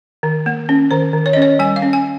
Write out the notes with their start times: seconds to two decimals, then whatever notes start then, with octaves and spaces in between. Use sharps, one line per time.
0.23 D#3
0.46 A#3
0.69 C#4
0.91 D#3 C5
1.13 D#3
1.26 C#5
1.33 C#4 D#5
1.42 C#5
1.59 G3 G#5
1.76 F5
1.82 C#4
1.93 G#5